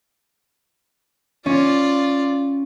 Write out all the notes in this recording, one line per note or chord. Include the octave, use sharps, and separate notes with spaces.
C#4 F4 D5